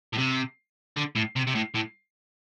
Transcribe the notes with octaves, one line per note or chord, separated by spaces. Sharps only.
A2
C3
D3
A2
C3
C3
A2
A2